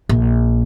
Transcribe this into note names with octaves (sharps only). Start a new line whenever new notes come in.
A#1